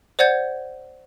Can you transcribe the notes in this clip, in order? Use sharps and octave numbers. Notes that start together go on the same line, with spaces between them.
C5 D5 F#5 G6 G#6